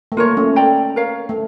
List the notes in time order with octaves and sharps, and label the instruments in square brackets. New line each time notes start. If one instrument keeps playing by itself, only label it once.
[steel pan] A3
[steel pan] A#3 [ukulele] F4 A#4 C#5
[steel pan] A3 C#4
[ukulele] A4 D5 G5 A#5
A#4 C#5 F5
[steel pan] A3